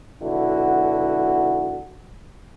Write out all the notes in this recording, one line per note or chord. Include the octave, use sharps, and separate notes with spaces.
B1 D3 E4 F#4